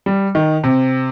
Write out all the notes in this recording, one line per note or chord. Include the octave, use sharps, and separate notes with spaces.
G3
D#3
C3